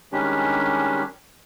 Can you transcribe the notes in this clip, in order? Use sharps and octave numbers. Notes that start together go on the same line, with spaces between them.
D#3 G3 G#3 C#4 D4 G4